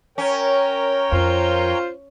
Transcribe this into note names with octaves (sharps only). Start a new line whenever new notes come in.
C#4 A#4 C#5 G5
F2 F4 C5